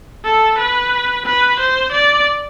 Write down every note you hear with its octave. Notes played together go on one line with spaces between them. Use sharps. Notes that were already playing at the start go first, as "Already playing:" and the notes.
A4
B4
B4
C5
D5